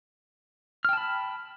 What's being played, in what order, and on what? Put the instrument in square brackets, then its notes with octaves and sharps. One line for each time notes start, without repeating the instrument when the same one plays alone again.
[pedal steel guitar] F6
G5
A5
B5